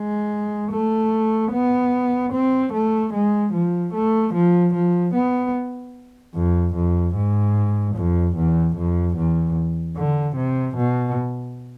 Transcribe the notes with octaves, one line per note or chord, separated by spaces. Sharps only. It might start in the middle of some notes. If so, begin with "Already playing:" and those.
Already playing: G#3
A3
B3
C4
A3
G#3
F3
A3
F3
F3
B3
F2
F2
G#2
F2
E2
F2
E2
D3
C3
B2